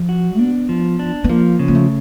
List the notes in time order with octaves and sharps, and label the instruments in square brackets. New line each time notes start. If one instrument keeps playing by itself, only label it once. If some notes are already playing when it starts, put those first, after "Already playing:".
Already playing: [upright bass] F3
[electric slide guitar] F#4
[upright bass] B3 [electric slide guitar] D4
[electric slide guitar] F3
D4
[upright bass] B3
[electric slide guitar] F3 [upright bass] A#3
[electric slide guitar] C#3
[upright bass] A#3
A3